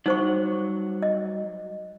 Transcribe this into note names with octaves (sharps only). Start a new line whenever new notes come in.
F#3 G3 D#4 C5 F#5 C#6
D#5